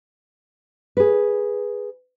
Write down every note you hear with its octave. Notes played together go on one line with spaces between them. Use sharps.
G#4 B4